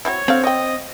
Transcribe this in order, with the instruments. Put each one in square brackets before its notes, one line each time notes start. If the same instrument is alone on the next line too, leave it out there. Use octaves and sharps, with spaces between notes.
[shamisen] F#3 C4 E4 [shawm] C#5
[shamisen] D3 F5 [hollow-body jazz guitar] C4
[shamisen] C#5 G5 [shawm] D#5